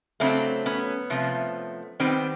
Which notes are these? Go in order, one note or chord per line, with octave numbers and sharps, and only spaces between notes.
C#3 F#3 A3 C4 D4
B3 C#4
C3 F3 A3
D#3 G3 B3 C4